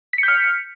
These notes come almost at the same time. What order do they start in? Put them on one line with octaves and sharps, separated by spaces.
B6 C#7 G6 F6